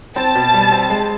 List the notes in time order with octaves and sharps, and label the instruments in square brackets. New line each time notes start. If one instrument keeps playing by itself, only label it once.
[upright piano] C4 [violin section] A5
[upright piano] B2
G3
C4
G#3